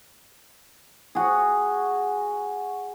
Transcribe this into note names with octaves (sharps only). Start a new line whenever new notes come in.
F#4 G#4